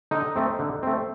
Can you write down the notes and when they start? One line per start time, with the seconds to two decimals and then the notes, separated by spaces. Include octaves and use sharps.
0.11 D3 D#4
0.36 A3 C4
0.59 D3
0.83 A3 C4